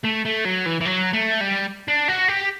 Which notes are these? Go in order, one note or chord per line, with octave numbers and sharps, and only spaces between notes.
A3
A3
F#3
E3
E3
F#3
A3
G3
D4
F#4
G4